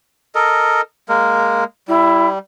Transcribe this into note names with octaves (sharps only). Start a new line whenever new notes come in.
A4 A#4 D#5
G#3 A#3 A#4
G3 E4